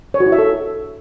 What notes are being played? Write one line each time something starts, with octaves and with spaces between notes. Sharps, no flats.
C#5
F#4
E4
E5
A4